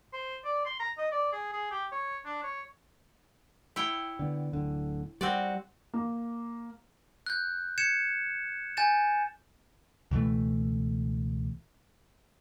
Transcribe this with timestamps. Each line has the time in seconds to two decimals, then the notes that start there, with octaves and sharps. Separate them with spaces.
0.13 C5
0.45 D5
0.66 C6
0.80 A#5
0.98 D#5
1.12 D5
1.33 G#4
1.53 G#4
1.71 G4
1.92 C#5
2.25 D4
2.43 C#5
3.76 E4 C#5 G5
4.19 D3 B3
4.53 D1 D3
5.21 G3 C4 F#4 D5
5.94 A#3
7.26 F#6 G6
7.78 G6 G#6 C#7 E7
8.77 G#5 G6 A6 E7
10.11 C#2 B2 E3 A3